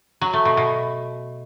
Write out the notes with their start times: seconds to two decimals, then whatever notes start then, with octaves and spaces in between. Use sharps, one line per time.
0.21 F#3
0.33 A3
0.45 B2
0.57 B2